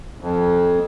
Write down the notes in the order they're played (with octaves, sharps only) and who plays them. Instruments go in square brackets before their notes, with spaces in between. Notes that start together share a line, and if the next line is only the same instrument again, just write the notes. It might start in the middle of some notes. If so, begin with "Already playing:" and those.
[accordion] F2